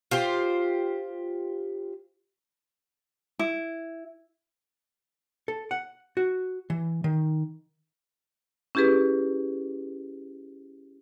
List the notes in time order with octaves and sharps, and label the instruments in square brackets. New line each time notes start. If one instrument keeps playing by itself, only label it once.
[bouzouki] F4 G4 C5
[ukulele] E4
[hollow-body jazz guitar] A4
F#5
F#4
E3
D#3
[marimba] C#4 E4 G4 G#4 B4